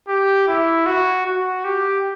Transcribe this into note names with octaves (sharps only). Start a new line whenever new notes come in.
G4
E4
F#4
F#4
G4